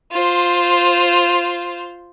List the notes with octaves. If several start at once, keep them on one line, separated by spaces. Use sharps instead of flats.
F4 C5